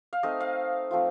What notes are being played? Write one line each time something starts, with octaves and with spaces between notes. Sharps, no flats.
F5
A3 C4 D#4 D#5
F5
F3 A3 C4 F4